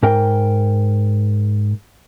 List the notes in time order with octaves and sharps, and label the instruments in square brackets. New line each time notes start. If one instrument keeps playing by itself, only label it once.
[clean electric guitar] G#2 A#4 G5